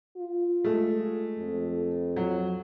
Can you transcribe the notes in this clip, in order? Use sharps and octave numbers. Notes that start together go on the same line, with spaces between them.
F4
G#3 A3
F2
F#3